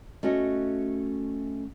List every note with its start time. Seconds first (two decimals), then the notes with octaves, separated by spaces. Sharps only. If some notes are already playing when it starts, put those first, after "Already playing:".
0.23 A3 C#4 F#4 D#5